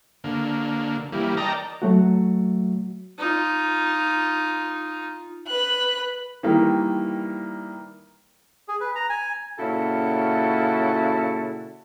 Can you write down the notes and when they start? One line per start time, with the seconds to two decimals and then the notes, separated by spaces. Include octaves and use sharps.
0.24 D3 A#3
1.12 E3 G3 A#3
1.37 A#4 D5 D#5 G5 A5 A#5
1.82 F#3 A3 F#4
3.18 D#4 F4
5.48 B4 F#6
6.43 D#3 E3 G3 A#3
8.68 G#4
8.80 B4
8.95 A#5
9.09 G#5
9.59 A#2 C#3 C#4 E4 F#4 A4